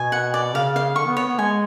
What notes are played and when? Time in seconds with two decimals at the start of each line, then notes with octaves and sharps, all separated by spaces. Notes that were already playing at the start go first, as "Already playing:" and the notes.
Already playing: B2 G#5
0.12 F#5
0.34 D5
0.55 C#3 F5
0.76 F5
0.96 D3 C#6
1.06 B3
1.17 B3 C#5
1.27 B3
1.39 G#3 G#5